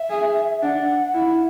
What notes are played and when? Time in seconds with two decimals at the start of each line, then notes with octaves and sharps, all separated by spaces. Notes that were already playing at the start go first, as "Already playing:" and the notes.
Already playing: E5
0.10 G#4
0.62 D4 F#5
1.14 E4